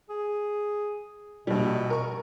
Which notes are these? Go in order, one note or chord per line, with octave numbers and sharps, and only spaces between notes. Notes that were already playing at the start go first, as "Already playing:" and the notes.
G#4
A#1 B2 G3
A#4 C#6